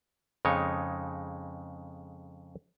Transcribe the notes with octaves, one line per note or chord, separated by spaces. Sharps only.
F2 C#3 G#3 D#4 C#5